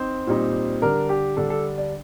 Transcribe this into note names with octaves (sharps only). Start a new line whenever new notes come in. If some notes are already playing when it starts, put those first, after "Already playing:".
Already playing: C4 D#4 C5
A#2 G3 C4 D#4
D3 G3 D4 A#4
G4
D3 G3 D4 A4
A4
D5